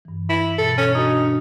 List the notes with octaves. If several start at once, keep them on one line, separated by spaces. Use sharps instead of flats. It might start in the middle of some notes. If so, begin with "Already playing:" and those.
G2 E3
E4
B2 A4 A6
C#4
D4 D#4 F#4